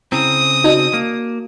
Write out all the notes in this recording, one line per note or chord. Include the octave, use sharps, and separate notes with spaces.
C#3 C4 E4 D#6
D#4 F#4 D5 A5
A#3